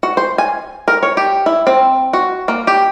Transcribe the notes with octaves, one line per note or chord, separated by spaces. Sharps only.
F#4
C5
G#5
A#4
C#5
G4
E4
C4
F#4
A#3
G4